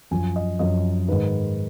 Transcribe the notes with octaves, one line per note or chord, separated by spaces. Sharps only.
F#2 F3 G#5
D#5
F#2 F3 D#5
G#2 D#3 B4